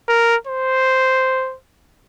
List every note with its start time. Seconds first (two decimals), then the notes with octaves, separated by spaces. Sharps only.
0.08 A#4
0.47 C5